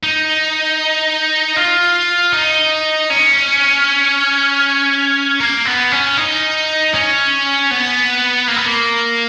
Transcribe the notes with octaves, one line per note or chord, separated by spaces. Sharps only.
D#4
F4
D#4
C#4
A#3
B3
C#4
D#4
C#4
B3
A#3
B3
A#3